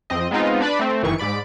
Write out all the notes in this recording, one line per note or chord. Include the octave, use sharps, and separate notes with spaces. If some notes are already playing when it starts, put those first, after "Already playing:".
F2 C4 D#5
G#3 B3 C4 D#4 F4
D4 B4 D5 B5
A3 C4
G1 D#3 E3 C#6
G#2 D5 B5 D7